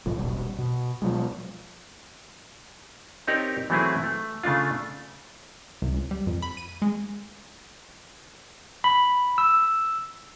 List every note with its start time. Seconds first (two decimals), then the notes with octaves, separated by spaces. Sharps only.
0.06 B1 A2 F3 A3
0.18 E1 A#1 B2 G3
0.59 B2
1.02 B2 F3 F#3 G#3
3.27 C4 D#4 G4 A#4 C#5 D5
3.70 E3 F#3 A3 C4 E4 G#4
4.04 A3
4.43 C#3 A3 D4 F4
5.82 C2
5.94 C#2
6.11 G3
6.27 F2
6.42 B5
6.57 D#7
6.82 G#3
8.84 B5
9.38 E6